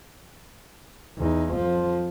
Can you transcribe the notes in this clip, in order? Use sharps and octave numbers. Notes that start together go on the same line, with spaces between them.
E2 D#4
F2 F3